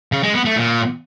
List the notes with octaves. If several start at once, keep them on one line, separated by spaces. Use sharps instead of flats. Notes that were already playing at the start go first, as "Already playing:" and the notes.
C#3
G#3
B3
A3
A#2